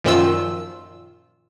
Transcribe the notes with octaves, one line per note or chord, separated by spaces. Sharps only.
F#2 A#2 D#3 F3 F4 E6